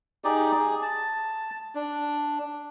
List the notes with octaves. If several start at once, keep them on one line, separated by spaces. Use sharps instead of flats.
D#4 G4 G#4 D5
G#4
A5
D4